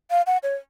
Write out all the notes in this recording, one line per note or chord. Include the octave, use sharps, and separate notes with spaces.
F5
F#5
C#5